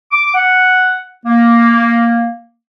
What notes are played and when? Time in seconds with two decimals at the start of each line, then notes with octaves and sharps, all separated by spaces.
0.12 D6
0.34 F#5
1.26 A#3